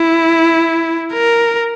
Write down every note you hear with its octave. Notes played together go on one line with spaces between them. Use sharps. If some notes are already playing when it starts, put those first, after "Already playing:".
Already playing: E4
A#4